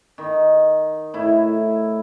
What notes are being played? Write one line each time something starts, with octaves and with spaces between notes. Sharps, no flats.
D#3
A2 E4